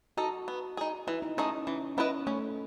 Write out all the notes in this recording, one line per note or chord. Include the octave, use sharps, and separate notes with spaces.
D#4 F#4 A4 D#5
B3
D#4 G#4
E3 E4
D#4
A3 C#4 D#4 G#4 D#5
E3 C#4
B3 C#4 E4 B4 D#5
A3 C#4